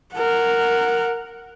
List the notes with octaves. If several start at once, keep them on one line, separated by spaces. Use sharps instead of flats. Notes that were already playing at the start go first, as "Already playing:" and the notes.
A#4 F#5